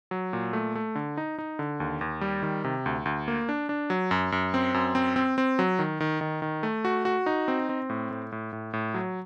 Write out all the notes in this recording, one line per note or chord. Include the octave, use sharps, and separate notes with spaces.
F#3
A#2
A3
A3
D3
D#4
D#4
D3
D#2
D#2
G3
D#3
C3
D2
D2
A#3
D4
D4
F#3
F#2
F#2
C4
F#2
C4
C4
C4
F#3
D#3
D#3
D#3
D#3
A3
F#4
F#4
D#4
C4
C4
A2
A2
A2
A2
A2
F#3